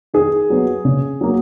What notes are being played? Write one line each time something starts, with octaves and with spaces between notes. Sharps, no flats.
D#3 G#4
F#3 B3
C#3
F#3 A#3